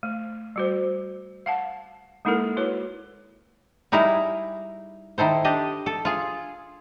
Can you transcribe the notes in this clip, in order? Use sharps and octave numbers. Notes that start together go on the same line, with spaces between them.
A3
G3 F#4 C5
F5 F#5 A5
G#3 A#3 D#4 E4 A4 A#4
E4 F#4 B4 C#5
G3 D#4 E4 G#4 A#4
D#3 E4 A4 C5
D4 G4 D#5
A4
F4 G#4